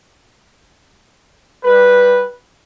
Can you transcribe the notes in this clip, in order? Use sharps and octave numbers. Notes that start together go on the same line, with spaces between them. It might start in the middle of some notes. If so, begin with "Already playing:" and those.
G3 B4